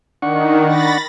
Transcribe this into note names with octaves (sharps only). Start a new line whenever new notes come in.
D#3 D4 F#5 C#6
B5 A6 A#6